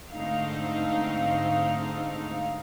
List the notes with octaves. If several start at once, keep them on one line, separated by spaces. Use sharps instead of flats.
G#2 D3 A3 C4 D#4 F5